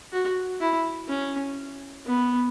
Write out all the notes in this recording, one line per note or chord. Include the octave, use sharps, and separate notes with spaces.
F#4
E4
C#4
B3